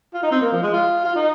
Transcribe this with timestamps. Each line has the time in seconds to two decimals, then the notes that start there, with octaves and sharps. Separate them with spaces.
0.14 F4
0.23 D#4
0.31 C4
0.41 A#3
0.52 F3
0.63 G#3
0.73 F4
1.05 F4
1.16 D#4